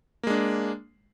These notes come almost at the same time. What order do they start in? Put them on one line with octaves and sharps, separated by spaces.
A#3 G#3 D4